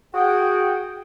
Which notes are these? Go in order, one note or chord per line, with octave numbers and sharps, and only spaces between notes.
F#4 G#4 G5